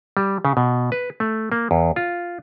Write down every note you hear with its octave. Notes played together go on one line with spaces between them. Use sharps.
G3
C#3
B2
B4
A3
A#3
E2
F4